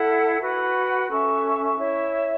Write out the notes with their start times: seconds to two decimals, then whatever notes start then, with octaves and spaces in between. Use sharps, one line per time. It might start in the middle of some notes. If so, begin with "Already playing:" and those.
Already playing: E4 A4 F#5
0.40 F#4 B4 F#5 B5
1.09 C#4 A4 E5 C#6
1.78 E4 C#5 E5